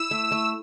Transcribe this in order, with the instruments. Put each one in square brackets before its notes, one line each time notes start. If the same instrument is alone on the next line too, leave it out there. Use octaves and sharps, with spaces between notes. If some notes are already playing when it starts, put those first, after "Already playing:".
Already playing: [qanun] E4 [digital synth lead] E6
[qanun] A3
A3